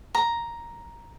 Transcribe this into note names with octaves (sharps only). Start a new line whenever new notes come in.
A#5